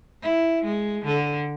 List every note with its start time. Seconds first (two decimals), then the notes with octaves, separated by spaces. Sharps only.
0.21 E4
0.64 G#3
1.05 D3